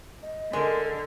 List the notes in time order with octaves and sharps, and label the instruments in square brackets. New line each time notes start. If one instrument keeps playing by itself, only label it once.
[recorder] D#5
[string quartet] D3 [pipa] G#3 [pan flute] A#4